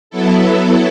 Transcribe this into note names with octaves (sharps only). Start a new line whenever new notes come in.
F#3 B3 E4 A4